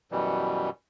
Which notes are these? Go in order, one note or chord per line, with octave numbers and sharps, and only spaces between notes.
F#2 B2 E3 G3